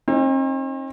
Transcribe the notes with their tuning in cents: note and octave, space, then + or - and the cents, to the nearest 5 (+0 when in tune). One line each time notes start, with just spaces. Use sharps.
C4 +45 D#4 +0